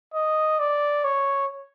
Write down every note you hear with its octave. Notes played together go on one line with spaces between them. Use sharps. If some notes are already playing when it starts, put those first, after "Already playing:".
D#5
D5
C#5